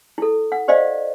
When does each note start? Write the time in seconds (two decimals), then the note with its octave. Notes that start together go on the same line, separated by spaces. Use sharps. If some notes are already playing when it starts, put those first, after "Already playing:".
0.18 E4 A4
0.52 F#5
0.68 G4 C5 D5 D#5 F5